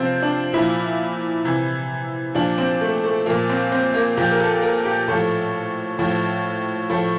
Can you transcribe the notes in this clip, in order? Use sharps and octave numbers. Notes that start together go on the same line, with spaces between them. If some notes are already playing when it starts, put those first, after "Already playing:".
Already playing: C3 F3 C4
D4
A#2 F3 E4
C3 E3
A#2 F3 D4
C4
A3
A3
A#2 F3 A#3
C4
C4
A#3
A#2 F3 G4
A#4
A4
A#4
G4
A2 F3 A4
A2 F3
A2 F3 A4